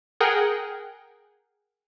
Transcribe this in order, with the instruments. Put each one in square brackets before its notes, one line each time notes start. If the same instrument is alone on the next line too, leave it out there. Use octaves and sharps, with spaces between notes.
[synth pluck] G#4 A#4 F#5 G5